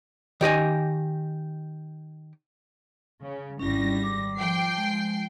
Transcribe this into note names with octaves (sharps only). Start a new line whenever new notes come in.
D#3 G4 D#5 G#5
C#3
G#1 G3 C#4 E4 A#6
D6
F3 G5 C7
G#3